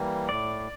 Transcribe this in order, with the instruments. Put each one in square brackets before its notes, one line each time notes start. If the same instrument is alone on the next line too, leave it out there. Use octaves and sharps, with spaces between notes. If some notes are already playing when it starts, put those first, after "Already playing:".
Already playing: [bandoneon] E3 G3 A#3
[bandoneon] A2 [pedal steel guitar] D5